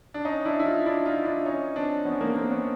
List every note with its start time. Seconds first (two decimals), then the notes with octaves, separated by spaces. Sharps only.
0.14 D4
0.25 C#4 D#4
0.45 D4 E4
0.59 E4
0.66 D#4 F4
0.86 D4 E4
1.06 D#4 F4
1.26 D4 E4
1.45 C#4 D#4
1.75 C4 D4
2.05 B3 C#4
2.20 A#3 C4
2.36 A#3 C4
2.51 B3 C#4